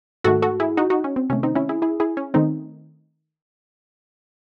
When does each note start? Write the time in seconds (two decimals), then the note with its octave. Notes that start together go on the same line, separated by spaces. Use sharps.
0.24 G#2 D#3 A3 F#4 A4
0.42 F#4 A4
0.60 E4 G#4
0.77 D#4 F#4
0.90 D#4 F#4
1.04 C#4
1.16 C4
1.30 C3 D#3 A3 C#4
1.43 C4 D#4
1.55 C#4 E4
1.69 E4 G#4
1.82 E4 G#4
2.00 E4 G#4
2.17 C#4
2.34 D#3 A3 C4 D#4